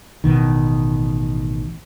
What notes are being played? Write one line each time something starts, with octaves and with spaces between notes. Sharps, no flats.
A1 B2 D#3